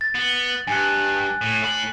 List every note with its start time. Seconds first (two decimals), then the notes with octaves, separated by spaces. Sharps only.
0.01 A6
0.15 B3
0.67 G2 G#5 F#6
1.41 A2
1.63 A2 B5